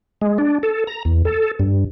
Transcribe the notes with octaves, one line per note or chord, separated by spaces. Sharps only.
G#3
D4
A4
A#5
E2
A4
G2